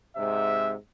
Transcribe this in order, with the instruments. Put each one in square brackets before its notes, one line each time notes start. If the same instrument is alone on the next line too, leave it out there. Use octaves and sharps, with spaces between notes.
[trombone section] G#2 C3 [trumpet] E5